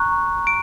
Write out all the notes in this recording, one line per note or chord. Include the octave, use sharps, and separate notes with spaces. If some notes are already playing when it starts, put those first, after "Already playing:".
Already playing: A#5 C#6 F#6
D7